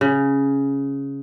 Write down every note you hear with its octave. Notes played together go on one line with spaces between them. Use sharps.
C#3